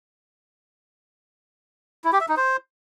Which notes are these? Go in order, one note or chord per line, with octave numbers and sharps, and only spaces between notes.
E4
G4
E5
D#4
C5